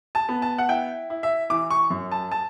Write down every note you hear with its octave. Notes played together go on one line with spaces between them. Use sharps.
A5
B3
A5
F#5
E4 G5
E4
E5
E3 D6
C#6
F#2
A5
A5